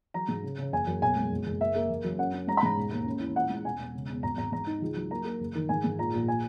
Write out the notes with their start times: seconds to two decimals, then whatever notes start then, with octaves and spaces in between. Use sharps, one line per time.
0.14 F#3 A#5
0.28 G#2
0.43 C#3
0.59 C#3
0.72 F#1 G#5
0.87 F#2
1.02 B1 G#5
1.17 G#3
1.31 F#1
1.46 F#1
1.60 A#3 E5
1.75 A#3
1.89 F#1
2.04 F#2
2.18 C#4 F#5
2.33 C#4
2.47 G#3 A#5
2.57 B5
2.63 G#2 A#5
2.77 E1
2.91 D#2
3.06 C#4
3.20 E3
3.36 A#2 F#5
3.50 G#3
3.65 E1 G#5
3.79 E1
3.95 C#3
4.09 E2
4.23 G#1 A#5
4.38 G#1 A#5
4.52 G#2 A#5
4.67 D#4
4.82 C#2
4.96 F#3
5.11 A#3 A#5
5.25 A#3
5.40 F#1
5.55 D#3
5.69 G#2 G#5
5.84 G#2
5.99 A#2 A#5
6.13 A#1
6.28 G#5